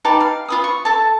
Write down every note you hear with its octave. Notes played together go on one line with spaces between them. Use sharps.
D#4 G4 B4 A5
F5
F4 B4 D#6
C#6
A4 A5